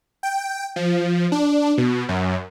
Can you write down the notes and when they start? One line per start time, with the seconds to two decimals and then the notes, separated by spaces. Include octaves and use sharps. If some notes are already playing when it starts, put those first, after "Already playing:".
0.23 G5
0.76 F3
1.32 D4
1.78 B2
2.09 F#2